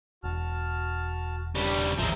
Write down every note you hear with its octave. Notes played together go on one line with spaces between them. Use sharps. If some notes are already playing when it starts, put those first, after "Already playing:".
E1 F#4 A5 F6
C#3 G3 D4 C#6
A1 D#2 F3 G#3 C5 E5 A#5